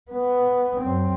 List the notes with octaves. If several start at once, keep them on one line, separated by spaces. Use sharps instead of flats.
B3
F#2 C4